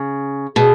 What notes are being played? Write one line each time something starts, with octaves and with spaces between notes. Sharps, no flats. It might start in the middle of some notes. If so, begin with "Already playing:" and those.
Already playing: C#3
B2 G#4